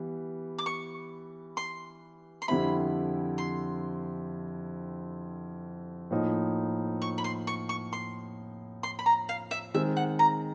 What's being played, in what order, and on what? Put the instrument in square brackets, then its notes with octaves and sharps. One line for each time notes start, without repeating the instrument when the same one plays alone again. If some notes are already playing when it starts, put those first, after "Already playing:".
Already playing: [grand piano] E3 G3 B3
[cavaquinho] D6
C#6
C6
C6
[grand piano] F2 D3 G3 C4 E4 [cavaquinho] B5
[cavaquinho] C6
[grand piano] A2 F3 A#3 D#4
[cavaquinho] C#6
B5
C6
C#6
C#6
C6
C6
B5
A#5
F5
E5
[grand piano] D#3 G#3 C4 [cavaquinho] E5
[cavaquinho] F#5
A#5